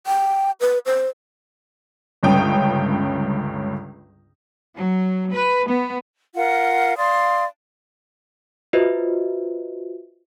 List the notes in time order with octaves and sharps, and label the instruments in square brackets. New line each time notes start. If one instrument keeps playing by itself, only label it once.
[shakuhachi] G5
B4
C5
[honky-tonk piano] G1 C#2 G2 C#4 G5 D#6
[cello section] F#3
B4
B3
[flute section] F4 A#4 F#5
D5 F5 C6 D#6
[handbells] F4 F#4 B4 C5 D#5 E5